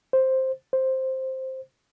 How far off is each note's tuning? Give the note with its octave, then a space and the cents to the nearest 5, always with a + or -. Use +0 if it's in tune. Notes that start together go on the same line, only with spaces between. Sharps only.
C5 +5
C5 +5